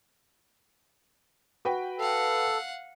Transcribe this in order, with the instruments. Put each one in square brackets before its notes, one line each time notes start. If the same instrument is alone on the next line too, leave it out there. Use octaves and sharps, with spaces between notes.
[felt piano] F#4 B4 G5
[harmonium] A4 [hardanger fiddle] F5 F#5